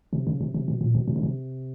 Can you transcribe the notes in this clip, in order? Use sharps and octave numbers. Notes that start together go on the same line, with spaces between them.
C3
C#3
C3
C3
B2
A#2
B2
C3
C#3
C3